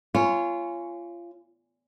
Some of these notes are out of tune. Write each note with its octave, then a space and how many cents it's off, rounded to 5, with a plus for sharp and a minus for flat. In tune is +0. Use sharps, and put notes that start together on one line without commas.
F4 -25 C#5 +0 G#5 +0